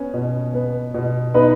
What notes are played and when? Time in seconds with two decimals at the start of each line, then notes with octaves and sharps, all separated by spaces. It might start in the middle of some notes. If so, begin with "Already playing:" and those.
Already playing: B3 C#4
0.14 B2
0.54 B3
0.94 B2
1.34 B3 D#4 B4